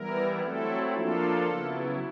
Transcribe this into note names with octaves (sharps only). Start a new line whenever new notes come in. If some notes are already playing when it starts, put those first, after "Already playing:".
Already playing: E3 G3 B3 E4 A#4
F#3 A3 C4 E4 A4
F3 A#3 D4 F4 A4
C#3 F#3 B3 E4